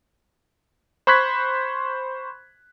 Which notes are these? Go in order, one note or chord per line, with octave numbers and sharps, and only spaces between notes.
C5 B5 C#6 F#6 G#6 B6